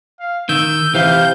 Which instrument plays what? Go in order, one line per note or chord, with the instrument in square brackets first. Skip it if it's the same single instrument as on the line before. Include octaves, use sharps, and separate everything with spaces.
[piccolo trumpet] F5
[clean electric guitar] D#3 [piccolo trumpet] E6 [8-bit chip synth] G6
[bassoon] C3 [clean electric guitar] E3 [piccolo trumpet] F5